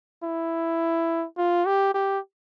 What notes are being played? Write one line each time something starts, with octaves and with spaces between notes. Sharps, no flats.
E4
F4
G4
G4